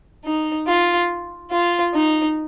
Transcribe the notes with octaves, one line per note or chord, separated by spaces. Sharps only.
D#4
F4
F4
D#4